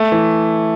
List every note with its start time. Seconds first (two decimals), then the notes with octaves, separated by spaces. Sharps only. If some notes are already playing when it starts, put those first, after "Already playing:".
Already playing: A3
0.12 E3